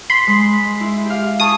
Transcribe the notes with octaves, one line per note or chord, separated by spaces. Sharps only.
B5 C6
G#3
E4
G4 F5
G#4 A5 C#6 D#6